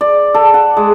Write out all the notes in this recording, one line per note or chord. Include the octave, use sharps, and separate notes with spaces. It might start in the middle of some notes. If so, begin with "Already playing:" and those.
D5
A4
F#5
G#3